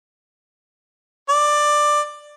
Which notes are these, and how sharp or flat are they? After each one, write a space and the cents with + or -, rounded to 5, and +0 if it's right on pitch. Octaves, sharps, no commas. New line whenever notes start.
D5 +15